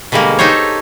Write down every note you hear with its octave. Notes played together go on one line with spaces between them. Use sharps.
B2 D3 G3 G#3 A#3
D#4 G4 A4 C5 C#5